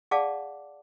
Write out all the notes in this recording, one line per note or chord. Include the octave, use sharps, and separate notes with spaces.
G#4 D5 F5 F#5 A5 D6